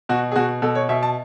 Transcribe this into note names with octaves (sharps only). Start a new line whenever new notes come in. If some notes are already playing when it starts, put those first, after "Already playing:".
B2 F#4
G#4
B2 F#4
B2 A4
C#5
B2 E5
A5